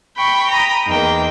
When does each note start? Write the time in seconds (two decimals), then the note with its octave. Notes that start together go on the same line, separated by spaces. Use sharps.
0.17 G5 B5 C#6
0.49 A#5 B5 D#6
0.86 E2 A#3 D#4 G5